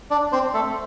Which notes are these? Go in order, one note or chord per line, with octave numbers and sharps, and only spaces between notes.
D4 D5
C4 C5
A3 A4